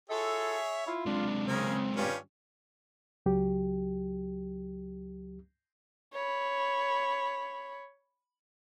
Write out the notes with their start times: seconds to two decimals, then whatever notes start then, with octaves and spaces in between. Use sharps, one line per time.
0.10 F4 F#4 G#4 A4 C#5 E5
0.87 E4 F4
1.06 C3 G#3 D4
1.47 C#3 C4 A#4 G#5
1.96 G2 C#4 F4 G4
3.26 C#2 F#3 G4
6.14 C#5 B5